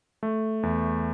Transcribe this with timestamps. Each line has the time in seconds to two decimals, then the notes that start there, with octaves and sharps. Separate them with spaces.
0.23 A3
0.63 E2